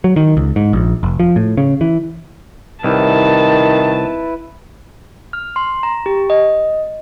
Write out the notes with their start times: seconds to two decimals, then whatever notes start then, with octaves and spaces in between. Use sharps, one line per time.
0.04 F#3
0.16 D#3
0.37 C#2
0.56 G#2
0.73 A#1
1.03 F1
1.20 F3
1.36 A2
1.57 C#3
1.81 E3
2.84 C2 D#3 E4 B4 A5
5.33 F6
5.56 C6
5.83 A#5
6.06 G4
6.30 D#5